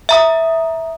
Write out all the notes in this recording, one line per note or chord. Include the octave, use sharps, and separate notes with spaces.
E5 A#5 D#6